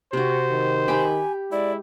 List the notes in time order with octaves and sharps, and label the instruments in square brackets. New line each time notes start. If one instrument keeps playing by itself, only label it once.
[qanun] C3 F#4 [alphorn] G4 [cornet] C5
[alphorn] D#3
[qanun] G4 G5 B5 [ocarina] G#5
[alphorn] G#3 [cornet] E4 [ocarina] D5